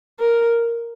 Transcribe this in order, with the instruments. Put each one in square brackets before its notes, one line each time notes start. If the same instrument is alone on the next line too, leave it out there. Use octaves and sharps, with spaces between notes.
[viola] A#4